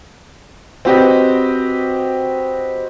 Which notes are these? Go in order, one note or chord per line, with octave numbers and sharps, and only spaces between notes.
C4 F#4 G4 B4 D#5